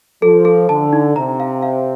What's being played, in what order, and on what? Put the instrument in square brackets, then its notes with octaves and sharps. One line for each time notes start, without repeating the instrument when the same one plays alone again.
[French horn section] F3 [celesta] A4
[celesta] A4
[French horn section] D3 [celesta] A5
[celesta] D#4
[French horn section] C3 [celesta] A#5
[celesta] F5
F5